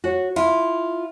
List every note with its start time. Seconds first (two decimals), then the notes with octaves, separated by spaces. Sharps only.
0.04 F#4 C#5
0.36 E4 F4